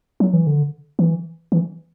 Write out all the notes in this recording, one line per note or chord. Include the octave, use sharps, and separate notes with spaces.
F#3
E3
D3
E3
E3